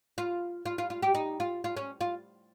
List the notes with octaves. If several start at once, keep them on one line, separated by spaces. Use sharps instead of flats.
F4
F4
F4
F4
G4
D#4
F4
F4
C#4
F4